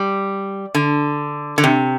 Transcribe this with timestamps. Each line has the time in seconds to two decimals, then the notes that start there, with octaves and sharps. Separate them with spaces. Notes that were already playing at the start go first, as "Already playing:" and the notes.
Already playing: G3
0.75 D3
1.58 D3
1.64 C3